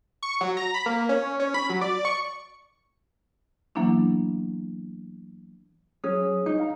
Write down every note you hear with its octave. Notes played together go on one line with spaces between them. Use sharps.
C#6
F#3
A#5
B5
A#3
C#4
C#4
B5
F#3
D5
C#6
E3 F#3 A#3 B3 D4 E4
F#3 C#4 G#4 D#6
D#4
F5 A#5